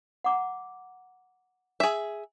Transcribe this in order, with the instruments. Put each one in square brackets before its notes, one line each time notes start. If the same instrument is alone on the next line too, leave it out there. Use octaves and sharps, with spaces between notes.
[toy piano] F#5 A#5 D6
[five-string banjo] G#4 E5